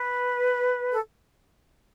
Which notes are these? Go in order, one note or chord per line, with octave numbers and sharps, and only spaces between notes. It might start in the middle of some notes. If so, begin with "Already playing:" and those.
Already playing: B4
A4